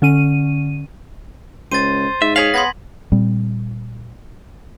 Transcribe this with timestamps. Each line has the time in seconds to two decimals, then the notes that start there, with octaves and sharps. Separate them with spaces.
0.02 D3 C#4 D#7
1.72 C#2 C5 A6 D#7
2.22 G#2 E5
2.36 G#4 C#5 F5 G#5 B6 F#7
2.54 B3 C6 G#6 A#6
3.12 A#2 G3 C4